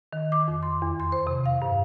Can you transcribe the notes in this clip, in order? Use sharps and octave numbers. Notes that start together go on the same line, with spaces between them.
D#3
D6
F2
C6
E2
C6
C5
C3
F5
G2